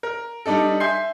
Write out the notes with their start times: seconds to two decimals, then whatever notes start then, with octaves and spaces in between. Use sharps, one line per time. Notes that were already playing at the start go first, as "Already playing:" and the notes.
0.03 A#4
0.46 G3 D4 D#4 A4
0.80 E5 G#5 C6 G6 C7